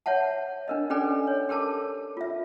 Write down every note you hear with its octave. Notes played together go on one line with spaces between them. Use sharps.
C#5 E5 F#5 A5
D4 A#4 D#5
C#4 G4 A4 B4 D5 G#5
C#5
G4 A4 A#4 A5 D6
F4 E5